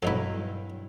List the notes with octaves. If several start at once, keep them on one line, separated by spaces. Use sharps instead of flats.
G2 B2 F#3 D#4 E4 A4